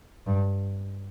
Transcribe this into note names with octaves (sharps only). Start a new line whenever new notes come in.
G2